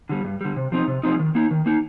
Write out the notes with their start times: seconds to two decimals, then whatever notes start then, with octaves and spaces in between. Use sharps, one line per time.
0.09 D3 G3
0.25 G2
0.41 D3 G3
0.56 C3
0.72 F3 C4 D#4
0.88 C3
1.03 F3 C4 D#4
1.19 D#3
1.35 A#3 D#4
1.51 D#3
1.66 A#3 D#4